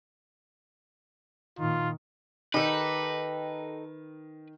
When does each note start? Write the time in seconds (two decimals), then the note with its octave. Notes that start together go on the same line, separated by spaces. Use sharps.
1.59 A#2 D#3 F4
2.54 D#3 D#4 G4 A4 B4